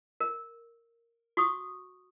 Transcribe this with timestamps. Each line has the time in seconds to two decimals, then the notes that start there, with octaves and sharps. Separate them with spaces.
0.20 A#4
1.37 F#4 C#6 D#6